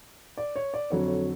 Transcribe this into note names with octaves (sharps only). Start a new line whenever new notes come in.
D5
C#5
D5
F2 D3 F#3 C#5
C#5